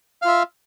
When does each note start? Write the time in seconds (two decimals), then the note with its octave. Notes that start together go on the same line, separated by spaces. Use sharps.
0.22 F5
0.25 F4
0.27 E5